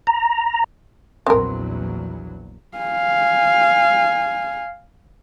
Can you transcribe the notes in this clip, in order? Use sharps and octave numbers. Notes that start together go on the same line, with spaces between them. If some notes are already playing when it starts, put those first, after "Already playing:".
A#5
A#1 E2 F#3 C4 A#4
F5 G#5